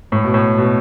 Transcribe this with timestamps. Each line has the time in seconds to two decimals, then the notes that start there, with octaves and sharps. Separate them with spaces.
0.12 A2
0.24 B2
0.34 A2
0.58 B2